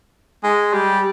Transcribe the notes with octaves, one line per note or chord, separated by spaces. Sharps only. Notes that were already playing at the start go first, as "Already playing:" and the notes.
G#3
G3